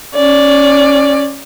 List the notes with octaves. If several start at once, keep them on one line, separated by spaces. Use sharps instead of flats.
C#4 D5